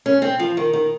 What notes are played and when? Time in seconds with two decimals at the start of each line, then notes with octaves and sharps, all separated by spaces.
0.06 C#4
0.22 C4
0.39 F3
0.57 D#3
0.73 D#3